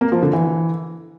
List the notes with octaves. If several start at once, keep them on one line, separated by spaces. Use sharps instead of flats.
A#3
F3
D3
E3